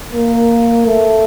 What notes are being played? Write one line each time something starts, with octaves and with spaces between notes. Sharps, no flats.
A#3
A3